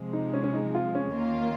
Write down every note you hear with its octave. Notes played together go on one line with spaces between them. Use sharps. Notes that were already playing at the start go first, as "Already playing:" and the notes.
Already playing: C3 F3 G#3
D#4
C#4
C#4
D#4
F4
C#4
D#2 D#3 A#3 F4